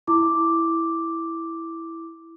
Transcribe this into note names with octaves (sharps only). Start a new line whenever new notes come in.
E4 D6